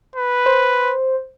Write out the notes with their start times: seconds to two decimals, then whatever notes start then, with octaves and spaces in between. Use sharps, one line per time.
0.16 B4
0.46 C5